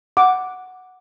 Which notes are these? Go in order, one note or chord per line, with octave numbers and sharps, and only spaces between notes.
F#5 D6